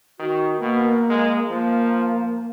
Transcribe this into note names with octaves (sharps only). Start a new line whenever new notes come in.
D#3 F#4
B2 A#3
G#3
F3 A#3